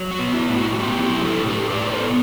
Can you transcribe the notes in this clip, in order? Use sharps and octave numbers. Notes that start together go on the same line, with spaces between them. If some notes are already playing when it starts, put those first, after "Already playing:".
Already playing: F#3
F#4
B3
E4
A2
F#4
F#4
B3 E4 G4
E4 G4
F#3
F#4 A4
A2
G4 B4
A2 B4 D5
B4
A4 C5
B3